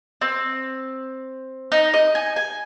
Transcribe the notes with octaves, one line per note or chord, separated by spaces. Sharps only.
C4
D#4
D#5
G#5
G#5